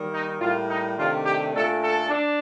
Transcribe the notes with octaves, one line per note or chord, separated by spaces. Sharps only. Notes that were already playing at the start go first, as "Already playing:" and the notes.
Already playing: D#3 G3 A#3
D#4
A2 G3 A#3 F4
D#4
C3 D#3 A3 D4 F4
G4
A#2 A3 D4 A4
A4
D4